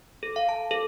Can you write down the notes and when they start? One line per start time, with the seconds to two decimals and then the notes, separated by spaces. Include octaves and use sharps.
0.23 A4
0.36 F5
0.49 A5
0.71 A4